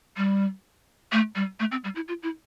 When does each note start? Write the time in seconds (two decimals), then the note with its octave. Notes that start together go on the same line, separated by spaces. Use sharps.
0.17 G3
1.12 A3
1.35 G3
1.60 A3
1.72 C4
1.84 G3
1.95 E4
2.08 F4
2.23 E4